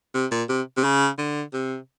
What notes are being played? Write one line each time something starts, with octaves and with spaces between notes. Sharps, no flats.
C3
A#2
C3
C3
C#3
D3
C3